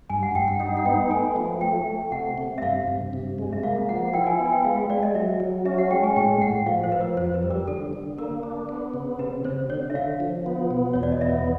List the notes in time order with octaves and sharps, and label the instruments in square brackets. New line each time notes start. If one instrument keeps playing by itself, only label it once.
[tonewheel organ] G2 [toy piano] G#5
[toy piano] F#5
[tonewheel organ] G2 [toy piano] G5
[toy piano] F#5
[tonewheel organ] D#4 [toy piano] F#5
[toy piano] F#5
[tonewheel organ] B3 [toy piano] G5
[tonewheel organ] A3 [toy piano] G#5
[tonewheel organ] F3
[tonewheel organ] A3 [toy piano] G5
[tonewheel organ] A3
[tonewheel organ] C3 [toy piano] F#5
[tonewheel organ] C3
[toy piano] E5
[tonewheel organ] G2 [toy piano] F5
[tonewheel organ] G2
C3
G#3
[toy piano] E5
[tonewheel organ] A#3 [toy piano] F5
[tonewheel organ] F3 [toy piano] F#5
[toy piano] F#5
[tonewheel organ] E4 [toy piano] G5
[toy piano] G#5
[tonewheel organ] B3
[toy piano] G#5
G5
[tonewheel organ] G#3 [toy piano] F5
[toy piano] F5
[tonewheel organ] G#3 [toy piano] D5
[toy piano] D#5
[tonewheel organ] F#3 [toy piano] E5
[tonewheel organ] F#3
[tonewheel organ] C#4 [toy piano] E5
[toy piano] F#5
[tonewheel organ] G#3 [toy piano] G5
[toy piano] G#5
[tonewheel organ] A2 [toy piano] G5
[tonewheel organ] A2 [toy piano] F#5
[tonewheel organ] F3 [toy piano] F5
[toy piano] C5
[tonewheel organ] F3 [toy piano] B4
[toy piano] A#4
[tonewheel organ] F2 [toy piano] C5
[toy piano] B4
[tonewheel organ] G3
[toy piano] A#4
[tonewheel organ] D3 [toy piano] A4
[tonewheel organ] D3
[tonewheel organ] A#3 [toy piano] A#4
[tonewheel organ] D4
B3
C#3
[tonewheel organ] C3 [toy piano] B4
[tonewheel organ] C3 [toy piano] C5
[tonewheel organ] D3 [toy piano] C#5
[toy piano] E5
[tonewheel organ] D3 [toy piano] F5
[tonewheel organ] F3
B3
B2
[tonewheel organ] E2 [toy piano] C#5
[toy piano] D5
D#5
[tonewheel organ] B3 [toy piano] E5